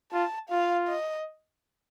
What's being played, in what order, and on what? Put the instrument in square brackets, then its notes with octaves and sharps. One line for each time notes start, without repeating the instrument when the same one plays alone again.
[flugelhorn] F4 [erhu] A5
[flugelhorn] F4 [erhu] F5
[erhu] D#5